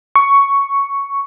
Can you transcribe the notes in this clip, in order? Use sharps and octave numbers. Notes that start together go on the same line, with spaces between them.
C#6